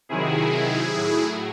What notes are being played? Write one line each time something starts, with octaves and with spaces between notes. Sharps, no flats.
C3 D#3 F#3 E4 G#4
A2 F#3